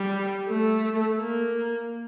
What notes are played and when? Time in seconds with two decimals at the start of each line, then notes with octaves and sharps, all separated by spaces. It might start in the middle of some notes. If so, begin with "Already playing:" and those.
Already playing: G3
0.48 A3
1.20 A#3